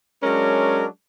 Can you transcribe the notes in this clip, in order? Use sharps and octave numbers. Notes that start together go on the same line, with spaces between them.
F#3 G#3 C#4 D4 A#4